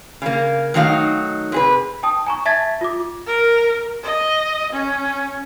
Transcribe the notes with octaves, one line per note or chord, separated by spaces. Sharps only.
C#3 A#3
D#3 F#3 A3 D#4 F5
C3 G#4 B4
G5 A5 D#6
G#5 A#5 C#6
E5 A5 G#6 A6 B6
F4 D6
A#4
D#5
C#4